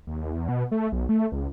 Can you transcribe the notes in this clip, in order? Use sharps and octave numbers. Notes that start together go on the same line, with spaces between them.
D#2
E2
B2
A3
B1
A3
C#2